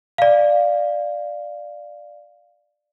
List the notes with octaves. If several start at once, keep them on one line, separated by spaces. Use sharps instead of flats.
D5 F5